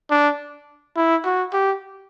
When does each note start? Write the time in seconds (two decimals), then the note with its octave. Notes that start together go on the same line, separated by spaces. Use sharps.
0.10 D4
0.96 E4
1.25 F#4
1.53 G4